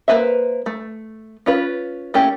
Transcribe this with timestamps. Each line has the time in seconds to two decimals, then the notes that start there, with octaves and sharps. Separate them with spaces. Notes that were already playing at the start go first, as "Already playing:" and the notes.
0.08 A#3 C#4 B4 C5 E5
0.66 A3
1.46 C#4 F4 B4
2.14 A3 A#3 C#4 E4 G4